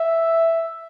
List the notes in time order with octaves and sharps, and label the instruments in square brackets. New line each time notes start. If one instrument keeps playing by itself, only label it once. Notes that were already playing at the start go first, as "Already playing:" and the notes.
Already playing: [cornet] E5